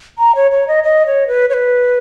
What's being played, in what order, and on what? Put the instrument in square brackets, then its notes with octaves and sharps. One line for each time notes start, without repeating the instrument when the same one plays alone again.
[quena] A#5
C#5
C#5
D#5
D#5
C#5
B4
C#5
B4